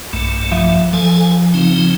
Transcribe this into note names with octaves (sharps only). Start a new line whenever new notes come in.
B1 G2 A3
F3 E5
F3 A4 G#5
C#3 C4 D#4